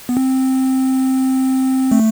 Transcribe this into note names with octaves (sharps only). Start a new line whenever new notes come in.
B3
C4
A3